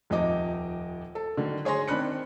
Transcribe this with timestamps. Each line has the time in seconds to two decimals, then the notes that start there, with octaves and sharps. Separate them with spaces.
0.10 D#1 F2 D#4 D#5 D6
1.15 A4
1.37 D3 D#3 F#3
1.65 G#4 C#5 G#5 C6 A#6
1.88 D#3 C4 D4 B5 F#6 C#7